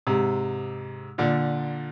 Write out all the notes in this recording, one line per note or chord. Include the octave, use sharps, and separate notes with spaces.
G#2 C3
A#2 D3